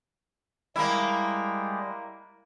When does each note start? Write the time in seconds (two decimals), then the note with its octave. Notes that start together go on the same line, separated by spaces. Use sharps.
0.76 G3 G#3 A#3 E4